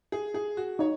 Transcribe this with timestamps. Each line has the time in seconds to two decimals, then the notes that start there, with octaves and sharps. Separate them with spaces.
0.12 G#4
0.34 G#4
0.57 F#4
0.79 D#4 C#5